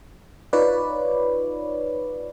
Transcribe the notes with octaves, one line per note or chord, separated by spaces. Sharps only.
D#4 F4 B4 C#5 D5